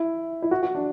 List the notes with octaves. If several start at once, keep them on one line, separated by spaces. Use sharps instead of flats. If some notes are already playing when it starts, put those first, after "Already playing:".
Already playing: E4
E4
F#4
F#4
D4